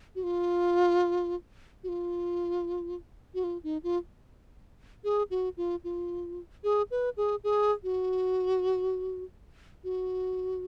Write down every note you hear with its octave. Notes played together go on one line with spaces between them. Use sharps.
F#4
F4
F#4
F4
F#4
F4
D#4
F4
G#4
F#4
F4
F4
G#4
B4
G#4
G#4
F#4
F#4